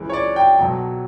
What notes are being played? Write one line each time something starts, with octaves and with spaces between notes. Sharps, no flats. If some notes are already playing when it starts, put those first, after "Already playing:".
Already playing: C#2 C#3 E3
C#5
D5
G5
B1 B2 F#3